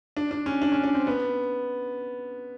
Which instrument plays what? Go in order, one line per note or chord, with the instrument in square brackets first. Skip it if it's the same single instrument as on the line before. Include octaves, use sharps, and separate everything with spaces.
[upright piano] D4
D4
C#4
D4
C#4
D4
C4
B3